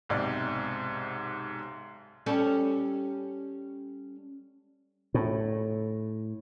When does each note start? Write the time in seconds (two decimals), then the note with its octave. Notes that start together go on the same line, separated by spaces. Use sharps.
0.09 B1 G#2 C3 D5
2.26 G3 C#4 A4
5.14 A2